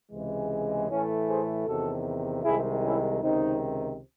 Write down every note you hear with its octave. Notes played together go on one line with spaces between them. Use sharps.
C#2 C3 E3 G#3
A2 E3 A3 C#4
G#4 C5
E2 C3 D#3 F#4 A4
C2 C3 D#3 G#3 E4 G#4
C#4 E4
C#2 C3 D#3 C4 D#4